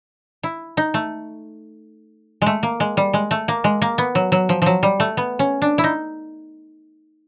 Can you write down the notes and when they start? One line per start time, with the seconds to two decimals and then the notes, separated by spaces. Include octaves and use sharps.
0.43 E4
0.77 D#4
0.94 A3
2.42 G#3 A3
2.63 A#3
2.80 G#3
2.97 G3
3.13 G#3
3.31 A3
3.48 A#3
3.64 G#3
3.82 A#3
3.98 B3
4.15 F#3
4.32 F#3
4.49 F3
4.62 F3 F#3
4.83 G3
5.00 A3
5.17 B3
5.39 C#4
5.62 D4
5.78 E4
5.84 D#4